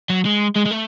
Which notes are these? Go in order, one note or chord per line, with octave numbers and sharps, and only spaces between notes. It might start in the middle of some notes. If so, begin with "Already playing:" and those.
F#3
G#3
G#3
G#3
A3